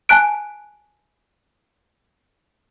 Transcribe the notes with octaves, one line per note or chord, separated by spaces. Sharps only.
G#5 A5 F#6 D7